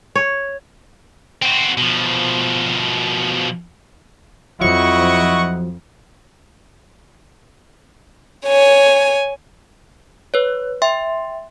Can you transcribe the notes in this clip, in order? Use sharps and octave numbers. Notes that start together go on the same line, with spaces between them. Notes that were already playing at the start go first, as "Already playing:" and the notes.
C#5
C4 F#4
B2 F3
F2 F3 F#3 E4 D#5 F#5 C#6
C#5 G#5
B4 C#5
E5 G5 C6